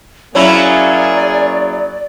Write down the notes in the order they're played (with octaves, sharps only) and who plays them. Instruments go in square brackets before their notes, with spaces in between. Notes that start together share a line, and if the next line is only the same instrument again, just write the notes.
[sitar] F#3 C#4 E4 [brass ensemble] A#3 G#4 [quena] D5